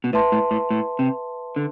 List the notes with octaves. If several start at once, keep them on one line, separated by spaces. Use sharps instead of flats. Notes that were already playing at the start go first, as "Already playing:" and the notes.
B2
A2 B4 E5 A5 C6
A2
A2
A2
C3
D3